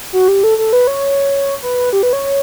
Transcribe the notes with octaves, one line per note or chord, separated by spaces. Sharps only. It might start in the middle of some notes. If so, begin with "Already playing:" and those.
F#4
G4
A4
A4
B4
C#5
B4
G4
B4
C#5